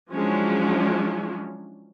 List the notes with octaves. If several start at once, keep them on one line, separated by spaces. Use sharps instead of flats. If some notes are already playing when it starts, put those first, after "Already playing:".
F3 F#3 G#3 C#4 D4 E4